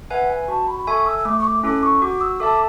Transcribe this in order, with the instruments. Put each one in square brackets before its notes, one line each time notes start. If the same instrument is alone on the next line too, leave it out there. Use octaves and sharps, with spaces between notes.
[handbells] B4 E5 G#5 [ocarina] F#5
[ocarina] G#5
[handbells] F#4 [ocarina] A5
[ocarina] B5
B5
[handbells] A4 E5 G#5 [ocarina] C#6
[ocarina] E6
E6
[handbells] A3 [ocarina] D6
[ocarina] C#6
D6
[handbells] C#4 E4 A4 [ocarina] D6
[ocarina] C#6
[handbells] F#4 [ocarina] D6
[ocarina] E6
[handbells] A4 E5 A5 [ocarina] D6